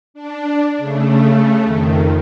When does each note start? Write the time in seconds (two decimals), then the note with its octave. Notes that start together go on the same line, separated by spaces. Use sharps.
0.14 D4
0.78 C#3 A3
1.64 F2 D#3